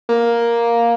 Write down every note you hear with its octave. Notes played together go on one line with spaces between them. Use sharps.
A#3